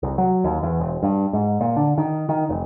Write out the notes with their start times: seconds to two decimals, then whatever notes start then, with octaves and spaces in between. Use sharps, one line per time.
0.03 C2
0.18 F#3
0.44 D#2
0.63 E2
0.80 E1
1.03 G2
1.33 G#2
1.61 A#2
1.76 D3
1.98 D#3
2.29 D#3
2.49 F1